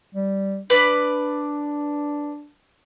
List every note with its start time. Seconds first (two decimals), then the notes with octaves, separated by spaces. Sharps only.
0.15 G3
0.70 D4 B4 D5